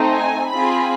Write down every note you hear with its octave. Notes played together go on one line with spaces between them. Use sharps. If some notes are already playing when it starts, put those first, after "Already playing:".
Already playing: A3 C4 D#4
G#5
C4 F4 G#4 B5